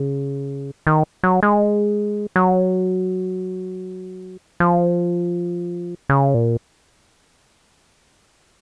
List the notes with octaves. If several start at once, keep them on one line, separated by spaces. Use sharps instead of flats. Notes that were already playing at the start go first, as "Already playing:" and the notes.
Already playing: C#3
D#3
F#3
G#3
F#3
F3
C#3
A#2